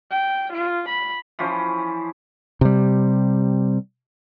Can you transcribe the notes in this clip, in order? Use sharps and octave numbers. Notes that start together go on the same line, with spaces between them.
G5
F4
B5
E3 F3 C#4 C5
C3 G3